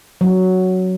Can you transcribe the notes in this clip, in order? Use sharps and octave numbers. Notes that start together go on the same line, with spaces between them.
F#3